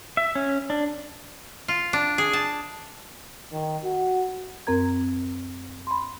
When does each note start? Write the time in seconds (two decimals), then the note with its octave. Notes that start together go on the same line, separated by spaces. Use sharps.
0.17 E5
0.35 C#4
0.70 D4
1.68 F4
1.93 D4
2.18 G#4
2.33 A5
3.53 D#3
3.84 F#4
4.67 F#2 C4 A#4 A#5 G#6
5.87 B5 C6